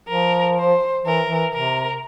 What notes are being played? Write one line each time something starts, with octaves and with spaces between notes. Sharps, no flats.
F3 A#4
C5
E3 A#4
E3
C3 A#4